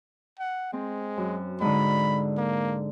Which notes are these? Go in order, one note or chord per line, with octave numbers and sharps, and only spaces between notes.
F#5
G#3 C4
F#2
G#2 D3 B5
A#3